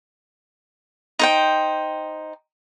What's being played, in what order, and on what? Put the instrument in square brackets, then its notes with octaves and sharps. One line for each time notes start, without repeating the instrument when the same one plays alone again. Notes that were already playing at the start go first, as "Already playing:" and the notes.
[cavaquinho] D#4 C5 G5